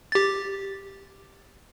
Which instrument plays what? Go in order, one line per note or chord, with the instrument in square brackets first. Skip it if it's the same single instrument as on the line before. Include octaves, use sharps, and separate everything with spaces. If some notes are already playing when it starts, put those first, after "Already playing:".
[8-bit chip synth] G4 A6